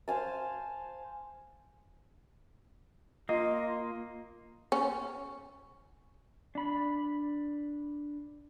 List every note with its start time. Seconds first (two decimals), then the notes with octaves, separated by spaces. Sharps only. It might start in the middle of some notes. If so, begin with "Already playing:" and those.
0.08 C5 F5 G#5 A5
3.29 A#3 F4 D#5
4.72 C#4
6.55 D4 B5